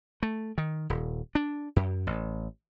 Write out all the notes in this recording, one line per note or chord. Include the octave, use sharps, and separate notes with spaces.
A3
D#3
D#1
D4
F#2
A1